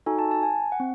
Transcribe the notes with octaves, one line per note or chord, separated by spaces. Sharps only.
D#4 F#4 A4 G#5
A5
A5
G#5
F#5
C4